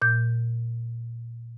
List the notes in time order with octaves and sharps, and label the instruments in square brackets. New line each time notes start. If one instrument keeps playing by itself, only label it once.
[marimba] A#2 G6